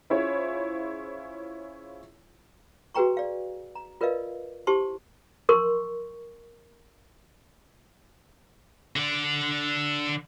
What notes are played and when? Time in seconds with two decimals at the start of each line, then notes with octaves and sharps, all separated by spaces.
0.10 C#4 E4 F4 G#4 C5 C#5
2.95 F#4 G#4 B4 G5 A#5 C#6
3.17 D5 F5
3.75 A#5
4.01 F4 A#4 B4 D5 D#5 F5
4.67 E4 G4 C5 A5 C6 C#6
5.49 A#4 C6 C#6
8.96 D3 D5